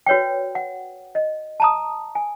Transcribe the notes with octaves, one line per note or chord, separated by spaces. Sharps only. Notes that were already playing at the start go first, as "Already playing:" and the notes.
F#4 B4 C#5 D5 G5
F#5
D#5
A5 A#5 D#6
G#5